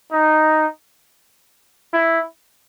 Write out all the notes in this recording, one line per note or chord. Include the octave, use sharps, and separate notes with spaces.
D#4
E4